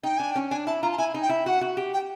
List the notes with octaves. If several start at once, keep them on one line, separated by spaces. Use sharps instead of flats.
D#4 G5
D4 G#5
G5
C#4
D4 G#5
E4 A5
F4 A#5
A5
E4 G#5
D#4
G5
E4
F#4 F#5
F#4
G4
G5